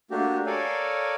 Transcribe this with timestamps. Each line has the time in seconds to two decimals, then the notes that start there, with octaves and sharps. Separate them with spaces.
0.11 A3 A#3 D4 F#4 G4
0.46 A4 A#4 C#5 D5 F5 G#5